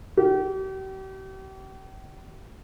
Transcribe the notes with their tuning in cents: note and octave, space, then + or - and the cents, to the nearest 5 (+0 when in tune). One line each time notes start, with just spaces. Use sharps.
G4 -40